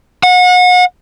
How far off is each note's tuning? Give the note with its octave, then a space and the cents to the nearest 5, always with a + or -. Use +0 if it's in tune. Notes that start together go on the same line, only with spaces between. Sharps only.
F#5 -35